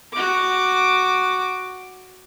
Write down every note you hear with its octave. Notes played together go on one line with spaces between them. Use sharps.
F#4 D6